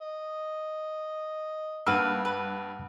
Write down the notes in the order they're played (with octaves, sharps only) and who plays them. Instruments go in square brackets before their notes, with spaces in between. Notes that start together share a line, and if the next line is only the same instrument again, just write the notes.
[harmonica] D#5
[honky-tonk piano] G2 [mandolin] A#3 B4 [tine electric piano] F#5 E6
[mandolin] B4